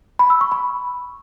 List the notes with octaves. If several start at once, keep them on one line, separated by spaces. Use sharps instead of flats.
B5
E6
C#6
B5